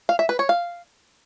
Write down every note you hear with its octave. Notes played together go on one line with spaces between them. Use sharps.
F5
E5
B4
C#5
F5